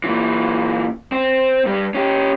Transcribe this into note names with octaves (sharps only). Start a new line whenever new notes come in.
A#2 E3
C4
G2 G3
C#4 G4